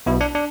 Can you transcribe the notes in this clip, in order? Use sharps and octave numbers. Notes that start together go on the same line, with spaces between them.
B1 B2 E4
D4
D4